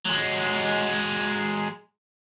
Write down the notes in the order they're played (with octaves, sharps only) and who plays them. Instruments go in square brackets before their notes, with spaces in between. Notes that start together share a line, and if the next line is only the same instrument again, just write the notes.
[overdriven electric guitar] F#3 G#3